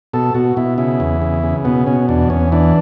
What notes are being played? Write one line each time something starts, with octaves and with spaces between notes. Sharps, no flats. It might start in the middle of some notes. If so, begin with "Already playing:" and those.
B2 A4
B2 F#4
B2 E4
C#3 E4
E2
C#3
C#3
B2 B3
B2 C#4
E2 D4
E2 C#4
E3 D4